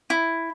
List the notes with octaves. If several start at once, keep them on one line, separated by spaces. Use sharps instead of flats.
E4